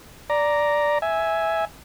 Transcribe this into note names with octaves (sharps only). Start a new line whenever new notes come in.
D5 A#5
E5 G#5